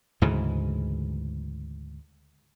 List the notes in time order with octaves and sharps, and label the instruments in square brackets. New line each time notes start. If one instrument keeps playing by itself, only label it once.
[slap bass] D2 G#2 C#3 E3